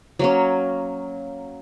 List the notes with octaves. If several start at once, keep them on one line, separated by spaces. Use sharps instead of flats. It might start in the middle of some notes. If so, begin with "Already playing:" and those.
F#3 A#3 C#4